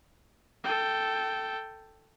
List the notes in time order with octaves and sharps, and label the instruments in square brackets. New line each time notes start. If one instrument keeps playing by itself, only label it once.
[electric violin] A4 G5